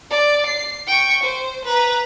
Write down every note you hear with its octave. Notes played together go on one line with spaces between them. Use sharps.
D5
C7
G5 C#6
C5
B4 A#5